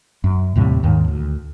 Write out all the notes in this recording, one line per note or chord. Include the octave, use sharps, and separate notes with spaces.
F#2
D#2 A2 C3 G3
D#2 G#2 D#3
D2